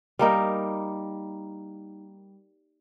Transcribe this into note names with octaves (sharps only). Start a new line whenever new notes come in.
G3 A#3 D#4